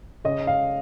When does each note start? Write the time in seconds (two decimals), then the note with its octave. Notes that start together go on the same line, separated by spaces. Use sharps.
0.24 C#3 D#5
0.47 F5